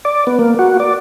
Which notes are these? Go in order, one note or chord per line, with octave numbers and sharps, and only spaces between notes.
D5
B3
A#3
F#4
D5